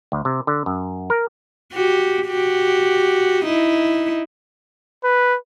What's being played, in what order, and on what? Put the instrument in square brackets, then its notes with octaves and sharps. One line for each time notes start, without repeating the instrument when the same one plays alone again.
[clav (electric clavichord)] D2
C3
D3
F#2
A#4
[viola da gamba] F#4 G4
F#4 G4
D#4 E4
[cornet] B4